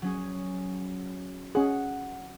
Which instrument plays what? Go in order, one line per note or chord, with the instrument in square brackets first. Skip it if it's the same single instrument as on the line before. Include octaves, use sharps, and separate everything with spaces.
[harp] F#3 C#4 G#4
[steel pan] C#4 G#4 [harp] F#5